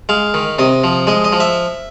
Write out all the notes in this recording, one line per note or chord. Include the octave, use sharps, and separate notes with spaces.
G#3 F5
D#3
C3 D#5
F3
G#3 D#5
D#5
F3
E5